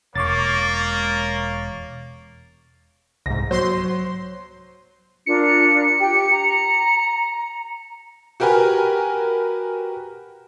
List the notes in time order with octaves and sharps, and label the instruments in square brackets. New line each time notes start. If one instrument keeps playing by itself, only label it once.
[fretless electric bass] E1 [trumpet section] A#3 [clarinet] C#5 [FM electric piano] C#6 D6 A6
[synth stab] C2 G#2 [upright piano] A#6
[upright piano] F#3 [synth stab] C5 C6
[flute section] D4 F4 A#4 [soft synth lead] C#7
[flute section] G4 G5
A#5
[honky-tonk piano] F#4 G4 A#4 B4 G#5